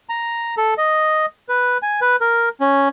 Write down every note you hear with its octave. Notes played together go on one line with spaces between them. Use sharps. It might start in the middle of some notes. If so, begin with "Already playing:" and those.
A#5
A4
D#5
B4
G#5
B4
A#4
C#4